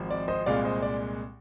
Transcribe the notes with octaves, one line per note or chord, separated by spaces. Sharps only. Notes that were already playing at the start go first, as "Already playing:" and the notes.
Already playing: G#1 G#2 F3 G#3 C4
D5
C5 D#5
C2 A#2 G#3 D5 F5
C5 D#5
D5